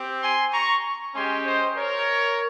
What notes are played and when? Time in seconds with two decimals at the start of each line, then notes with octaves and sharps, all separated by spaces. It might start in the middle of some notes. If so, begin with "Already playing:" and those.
Already playing: C4 G4
0.23 G#5 C6
0.53 A#5 C#6
1.15 G#3 C#4 G4 G#5 C6
1.45 C5 D#5
1.76 A#4 C#5